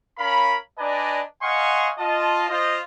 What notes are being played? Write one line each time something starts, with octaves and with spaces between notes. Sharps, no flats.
C#4 A#4 F5 B5
D4 B4 D5 D#5 G#5 A#5
D#5 F5 F#5 G#5 C6 C#6
F4 D#5 A5
F4 C5 D#5